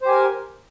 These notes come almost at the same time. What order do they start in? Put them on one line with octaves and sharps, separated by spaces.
C5 G4 G#5 A#4